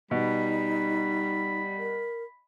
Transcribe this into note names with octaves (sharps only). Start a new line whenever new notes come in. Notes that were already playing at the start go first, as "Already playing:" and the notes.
B2 G3 D#4 B5
A#4